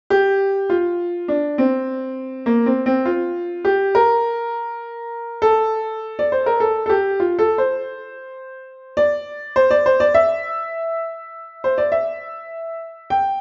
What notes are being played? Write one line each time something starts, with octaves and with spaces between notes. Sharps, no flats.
G4
F4
D4
C4
A#3
C4
C4
F4
G4
A#4
A4
D5
C5
A#4
A4
A4
G4
F4
A4
C5
D5
C5
D5
C5
D5
E5
C5
D5
E5
G5